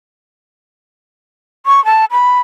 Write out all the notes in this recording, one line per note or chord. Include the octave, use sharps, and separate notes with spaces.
C#6
A5
B5